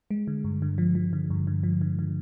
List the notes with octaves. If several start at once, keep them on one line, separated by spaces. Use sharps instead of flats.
G#3
D3
G2
D3
F3
F3
D3
G2
D3
F3
D3
D3